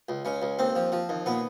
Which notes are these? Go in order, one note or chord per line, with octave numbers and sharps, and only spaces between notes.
C#2
C#2 C#4
C#2
D#2 C4
F3
F3
D#2
A#2 B3